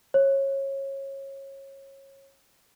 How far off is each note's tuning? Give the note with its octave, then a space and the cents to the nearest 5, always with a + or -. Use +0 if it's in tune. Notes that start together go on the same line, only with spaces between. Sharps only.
C#5 -25